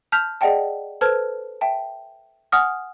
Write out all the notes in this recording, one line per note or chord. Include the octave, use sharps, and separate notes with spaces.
A5 F6 G6 B6 F7
G#4 D5 D#5 F#5 G5 A5
A4 B4 C5 A5 F6 G#6
E5 G5 A5
F#5 G#5 D#6 F6